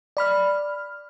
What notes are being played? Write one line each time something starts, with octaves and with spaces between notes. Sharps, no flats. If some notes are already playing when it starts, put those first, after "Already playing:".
D5 B5 F6